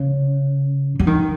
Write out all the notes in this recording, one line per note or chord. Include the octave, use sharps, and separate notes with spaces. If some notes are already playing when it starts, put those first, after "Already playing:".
Already playing: C#3
F#3
D#3